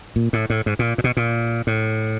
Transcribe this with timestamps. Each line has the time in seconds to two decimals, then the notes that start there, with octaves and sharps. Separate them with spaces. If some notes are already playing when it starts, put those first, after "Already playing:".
0.16 A#2
0.33 A2
0.50 A2
0.66 G#2
0.79 A#2
0.98 A#2
1.04 B2
1.17 A#2
1.67 A2